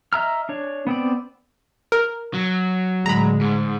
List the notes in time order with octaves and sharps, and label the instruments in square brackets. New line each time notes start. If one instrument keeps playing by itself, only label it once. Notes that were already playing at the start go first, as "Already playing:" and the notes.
[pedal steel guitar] D#5 E5 A#5 F6
D4 C#5
B3 C4 D5
[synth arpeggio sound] A#4
[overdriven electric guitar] F#3
[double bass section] A2 D3 G#3 [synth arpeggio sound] A#5 B5
[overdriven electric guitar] G#2